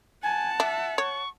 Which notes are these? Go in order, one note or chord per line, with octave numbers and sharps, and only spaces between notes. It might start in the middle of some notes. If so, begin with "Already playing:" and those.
F#5 G#5 A5
D4 E5
C#5 C#6